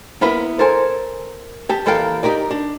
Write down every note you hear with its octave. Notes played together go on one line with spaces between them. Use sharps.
A#3 B3 E4 A#4 B4
A4 A#4 C5 G#5
G4 A5
D#2 E3 A4 A#4 F5 G5
D#4 G4 A#4 D5
D4